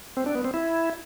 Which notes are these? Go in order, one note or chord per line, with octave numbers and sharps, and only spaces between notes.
C4
D4
B3
C4
E4